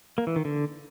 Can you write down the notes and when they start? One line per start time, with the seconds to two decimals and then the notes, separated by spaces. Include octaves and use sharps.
0.18 A#3
0.27 E3
0.36 D#3
0.45 D3